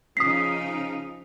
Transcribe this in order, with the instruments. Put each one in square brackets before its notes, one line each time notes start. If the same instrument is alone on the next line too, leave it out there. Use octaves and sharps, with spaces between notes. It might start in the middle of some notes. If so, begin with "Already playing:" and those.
[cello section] C#3 F3 D#4 [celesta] D#6 B6 C7